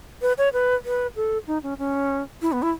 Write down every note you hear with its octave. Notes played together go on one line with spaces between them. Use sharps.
B4
C#5
B4
B4
A4
D#4
C#4
C#4
E4
B3
E4